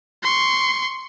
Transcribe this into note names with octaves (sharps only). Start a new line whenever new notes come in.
C6 C#6